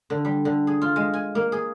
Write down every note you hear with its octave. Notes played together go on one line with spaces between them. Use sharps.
D3
G3
D3
G#4
F4
G#3
G#5
A#3
G#4